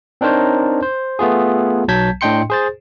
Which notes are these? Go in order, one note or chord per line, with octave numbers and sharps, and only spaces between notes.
C4 D4 D#4 A#4 C5 C#5
C5
A3 B3 F4 G#4
B1 F#3 A5 G6 G#6 B6
A2 D4 D#5 G5 C6 C#7
G#4 C5 A6